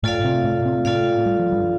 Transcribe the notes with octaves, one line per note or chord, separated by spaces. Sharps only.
A2 A3 F4 A4 D5 F5
C3 C4
A2 A3
C3 C4
A2 A3 F4 A4 D5 F5
G3
F3
G2 G3